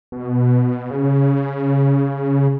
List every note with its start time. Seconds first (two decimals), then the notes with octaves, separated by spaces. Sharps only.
0.12 B2
0.91 C#3